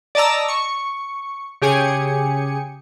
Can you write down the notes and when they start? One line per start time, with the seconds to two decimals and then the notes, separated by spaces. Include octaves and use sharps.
0.15 D5 D#5 A5 A#5 E6
0.48 C#6
1.62 C#3 G4 G#4 G#5 C#7